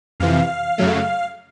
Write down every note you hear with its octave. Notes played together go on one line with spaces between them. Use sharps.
F2 C3 E3 F5
F#2 C#3 F#3 A3